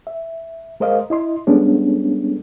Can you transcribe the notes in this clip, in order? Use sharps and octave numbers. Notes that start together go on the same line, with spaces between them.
E5
G#3 A#4 C5 D#5 F5
E4 D#5 C6
G3 G#3 B3 C#4 D4 A4